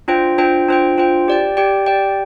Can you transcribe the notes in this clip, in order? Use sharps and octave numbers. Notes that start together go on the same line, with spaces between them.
D4 F4 C5 G5
D4 F4 C5 G5
D4 F4 C5 G5
D4 F4 C5 G5
G4 D5 G5
G4 D5 G5
G4 D5 G5